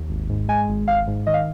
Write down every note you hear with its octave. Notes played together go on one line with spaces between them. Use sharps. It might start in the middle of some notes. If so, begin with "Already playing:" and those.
Already playing: D#2
G#1
G#2
G#3 G#5
G#1
G#1 F5
G#2
D#3 D#5
F5